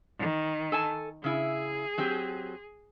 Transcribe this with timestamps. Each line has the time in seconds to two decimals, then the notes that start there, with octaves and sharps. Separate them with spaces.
0.19 D#3
0.72 A4 G#5 A5
1.24 C#3 E4 G#4
1.98 F#3 C4 G4